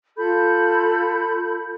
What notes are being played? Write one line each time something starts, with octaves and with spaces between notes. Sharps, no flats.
F4 A4 B5 G6